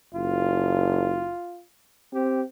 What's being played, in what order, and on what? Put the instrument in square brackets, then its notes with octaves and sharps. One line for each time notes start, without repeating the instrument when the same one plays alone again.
[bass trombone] F#1 [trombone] F4
[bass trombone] C4 [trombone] G4